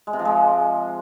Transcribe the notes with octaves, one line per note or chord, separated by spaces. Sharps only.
G#3
C3
F3
G#3